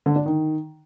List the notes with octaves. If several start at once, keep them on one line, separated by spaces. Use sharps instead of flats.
D3
D4
D#3